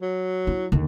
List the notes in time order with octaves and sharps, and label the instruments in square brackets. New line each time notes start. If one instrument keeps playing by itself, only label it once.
[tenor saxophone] F#3
[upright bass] E4
D#2 D3